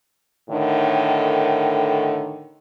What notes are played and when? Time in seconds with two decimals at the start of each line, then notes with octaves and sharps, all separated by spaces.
0.50 A2 D3 D#3